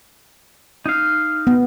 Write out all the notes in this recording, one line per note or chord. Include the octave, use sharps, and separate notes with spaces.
D#4 F5
B3